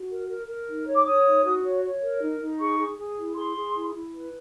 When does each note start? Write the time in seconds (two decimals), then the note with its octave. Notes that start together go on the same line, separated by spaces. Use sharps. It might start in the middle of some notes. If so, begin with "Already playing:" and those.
Already playing: F#4
0.09 A#4
0.28 A#4
0.47 A#4
0.67 D#4
0.86 C#5
0.95 D6
1.05 C#5 D#6
1.25 D#4
1.44 F#4
1.63 C#5
1.82 C#5
2.01 A#4
2.20 D#4
2.39 D#4
2.59 G#4 C#6
2.78 G#4
2.97 G#4
3.17 E4
3.35 G#4 C6
3.56 G#4
3.75 E4
3.93 E4
4.13 B4